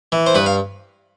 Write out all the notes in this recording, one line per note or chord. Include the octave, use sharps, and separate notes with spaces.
E3
C5
G2 B4
F5